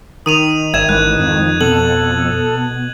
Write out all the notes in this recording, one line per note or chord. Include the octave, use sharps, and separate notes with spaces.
D#3 D#6 D#7 F7
G#1 E5 G#6 E7
A1 G#2 E3 F#6
F2
B2 A4 F#7